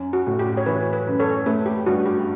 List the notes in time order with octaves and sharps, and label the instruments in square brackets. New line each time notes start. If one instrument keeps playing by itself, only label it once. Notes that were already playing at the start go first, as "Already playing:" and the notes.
Already playing: [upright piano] F#2 C#4
[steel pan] F#4
[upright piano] A2
[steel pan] G4
C#5
[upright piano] E3 [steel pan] B4
[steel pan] B4
[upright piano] F#2
[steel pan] A4 C#5
[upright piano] A3 [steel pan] B4
[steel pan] G4
[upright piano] G2 [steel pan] F#4
[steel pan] G4